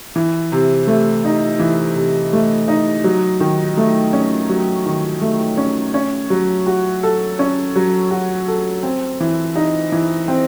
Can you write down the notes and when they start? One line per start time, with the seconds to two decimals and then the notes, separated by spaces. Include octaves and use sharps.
0.16 E3
0.52 C3
0.87 A3
1.24 D#4
1.59 E3
1.96 C3
2.33 A3
2.68 D#4
3.04 F#3
3.40 D#3
3.77 A3
4.13 C#4
4.49 F#3
4.86 D#3
5.21 A3
5.57 C#4
5.94 C#4
6.30 F#3
6.67 F#4
7.03 A4
7.39 C#4
7.76 F#3
8.11 F#4
8.48 A4
8.83 C4
9.20 E3
9.56 D#4
9.92 E3
10.28 C4